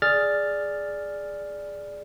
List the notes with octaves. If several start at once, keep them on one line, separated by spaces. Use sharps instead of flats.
G#4 D5 F6 A6